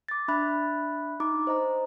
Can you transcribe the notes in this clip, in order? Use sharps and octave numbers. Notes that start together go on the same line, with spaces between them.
D6 A6
D4 E5 B5 F#6
D#4 A#5 D6
C5 D#5 A#5